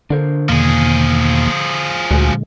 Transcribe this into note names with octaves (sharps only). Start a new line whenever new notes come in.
D3 D4 A#4 C5
E2 B2 D#3 F3 A#3 G#4
D2 A#2 D3 G#3 F#4 G#5